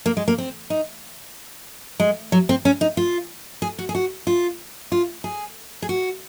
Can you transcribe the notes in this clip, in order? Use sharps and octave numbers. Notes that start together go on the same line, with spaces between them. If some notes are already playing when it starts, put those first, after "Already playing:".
A#3
G#3
A#3
C4
D#4
G#3
F#3
C4
C#4
D#4
F4
G#4
F#4
G#4
F#4
F4
F4
G#4
G#4
F#4